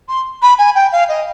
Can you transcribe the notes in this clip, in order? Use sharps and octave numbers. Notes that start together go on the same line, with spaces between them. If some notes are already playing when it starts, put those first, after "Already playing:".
C6
B5
G#5
G5
F5
D#5